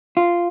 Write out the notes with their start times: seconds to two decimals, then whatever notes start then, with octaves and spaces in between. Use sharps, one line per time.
0.17 F4